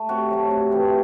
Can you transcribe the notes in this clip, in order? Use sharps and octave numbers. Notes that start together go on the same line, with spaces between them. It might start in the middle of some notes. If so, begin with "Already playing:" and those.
Already playing: A3
C3 F#4
F#3 A3
C3
E3 A3 C4